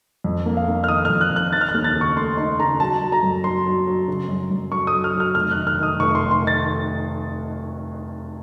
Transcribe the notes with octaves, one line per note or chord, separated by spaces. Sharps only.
F2
A#3
F5
A#3
F6
D#3 D#6
F2 F6
F#6
F2
F#6
D#4 A6
F6
F#6
D#2
A6
C#3
C#6
A3 C6
D#4 C6
C#3 A#5
F#3 A5
F#3
A#5
F#2
F#3 C6
F#3
F#3
C#3
F#2
F#2
F#2 C#6
D#6
F#3
F6
F#3
F6
F1 F6
D#3 F#6
F6
D#3 D#6
F1 C#6
C6
F1
C6
D#3
A6